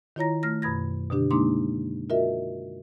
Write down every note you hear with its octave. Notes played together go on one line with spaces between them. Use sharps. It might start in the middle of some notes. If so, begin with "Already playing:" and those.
D#3 E4 F4 C#5 A#5 A#6
A3 F6 A#6
F#2 B2 B5 G#6 A#6
B2 D3 D4 G4
G#3 A#3 D4 D#4 C6 D6
F4 F#4 A#4 D#5 E5